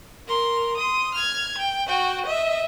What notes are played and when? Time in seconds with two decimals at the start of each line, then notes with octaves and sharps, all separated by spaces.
0.28 A#4 C6
0.77 C6 D#6
1.14 F6 G#6
1.58 G5
1.88 F#4 G5
2.26 D#5 E5